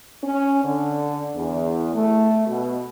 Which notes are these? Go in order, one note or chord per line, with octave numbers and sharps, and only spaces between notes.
C#4
D3
E2
A3
B2